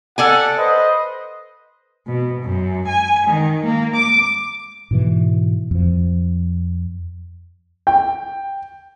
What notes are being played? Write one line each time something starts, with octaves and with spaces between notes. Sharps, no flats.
G4 A4 D5 F#5 G#5
B4 C5 D#5
B2
F#2
G#5
D#3
A#3
D6
G#2 B2 E3
F2 F3
G5